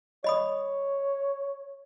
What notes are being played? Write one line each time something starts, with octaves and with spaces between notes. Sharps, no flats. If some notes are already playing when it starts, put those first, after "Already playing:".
C#5 D#5 B5 D#6